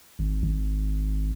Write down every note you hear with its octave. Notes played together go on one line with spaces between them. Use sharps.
G#1
G#1